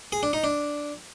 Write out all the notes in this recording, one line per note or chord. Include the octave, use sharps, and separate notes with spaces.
G#4
D4
D#4
D4